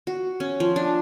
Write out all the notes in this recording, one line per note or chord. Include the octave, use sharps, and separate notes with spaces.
F#4
C#4
F3
D4